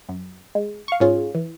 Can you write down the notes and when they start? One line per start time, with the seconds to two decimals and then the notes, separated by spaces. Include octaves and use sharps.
0.09 F#2
0.55 G#3
0.88 F5 C#6
1.00 G#2 C#4 F4 G#4
1.35 E3